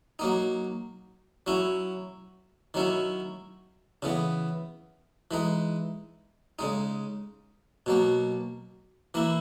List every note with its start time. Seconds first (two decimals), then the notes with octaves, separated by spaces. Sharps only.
0.19 F#3 A#3 D#4
1.47 F#3 C#4 E4
2.74 D#3 F#3 C#4 E4
4.02 C#3 E3 B3
5.31 E3 G#3 D#4
6.59 C#3 G#3 D#4
7.86 B2 F#3 A#3
9.14 E3 A#3 E4